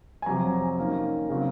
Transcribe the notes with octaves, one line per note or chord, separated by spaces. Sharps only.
G#5
F2 C3 F#3 A#5
D#3 A#3 C#4
C#3 F#3 C4